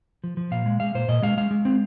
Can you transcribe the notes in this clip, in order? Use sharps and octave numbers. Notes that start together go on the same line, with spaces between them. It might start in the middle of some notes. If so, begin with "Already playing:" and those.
F3
F3
A#2 F5
G#3
G#3 F5
A#2 C5
A#2 D#5
G#3 F5
G#3 F5
G#3
C4